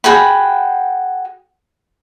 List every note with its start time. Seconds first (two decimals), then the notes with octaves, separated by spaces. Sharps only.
0.04 F#4 G#4 G5 B5